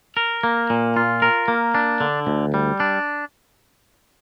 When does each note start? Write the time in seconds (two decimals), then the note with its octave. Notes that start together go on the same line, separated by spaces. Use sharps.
0.17 A#4
0.43 A#3
0.70 A#2
0.96 F4
1.22 A#4
1.48 A#3
1.75 D4
2.01 D3
2.27 D2
2.54 G3
2.80 D4